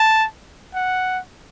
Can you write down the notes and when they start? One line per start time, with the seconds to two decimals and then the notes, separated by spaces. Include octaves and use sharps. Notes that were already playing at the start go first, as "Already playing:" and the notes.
Already playing: A5
0.75 F#5